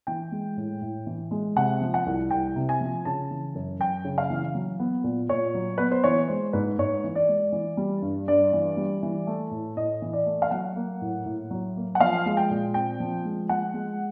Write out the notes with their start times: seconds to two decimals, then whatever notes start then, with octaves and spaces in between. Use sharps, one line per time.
0.07 E3 G5
0.32 G#3
0.57 A2
0.82 A2
1.07 E3
1.31 G#3
1.56 C3 F#5
1.81 F3
1.94 F#5
2.06 C2
2.31 C2 G5
2.56 C3
2.69 G#5
2.81 F3
3.05 C#3 A5
3.31 E3
3.55 F#2
3.80 F#2 G5
4.04 C#3
4.18 F5
4.30 E3
4.55 F#3
4.80 B3
5.04 A#2
5.29 A#2 C#5
5.54 F#3
5.78 B3 B4
5.92 C5
6.04 E3 C#5
6.28 G#3 C5
6.53 G#2 B4
6.78 G#2 C#5
7.04 E3
7.15 D5
7.28 G#3
7.52 E3
7.77 G3
8.02 G2
8.28 G2 D5
8.53 E3
8.77 G3
9.03 E3
9.27 A3
9.51 A2
9.77 A2 D#5
10.02 E3
10.13 D5
10.26 A3
10.42 F5
10.51 F#3 F#5
10.76 A#3
11.02 A2
11.26 A2
11.51 F#3
11.76 A#3
11.95 F#5
12.00 F3 F5
12.26 G#3
12.37 G5
12.50 A#2
12.74 C4 G5
13.00 F3
13.25 G#3
13.49 F3 F#5
13.74 G#3